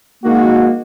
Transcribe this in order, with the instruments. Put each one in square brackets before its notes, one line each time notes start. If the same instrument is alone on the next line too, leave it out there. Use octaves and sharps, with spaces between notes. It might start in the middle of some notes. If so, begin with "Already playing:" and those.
[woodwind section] D#3 A#3 [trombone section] G#3 F#4